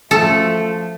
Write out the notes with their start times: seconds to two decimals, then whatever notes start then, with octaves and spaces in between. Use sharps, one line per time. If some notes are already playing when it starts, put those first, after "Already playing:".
0.11 F3 A3 A4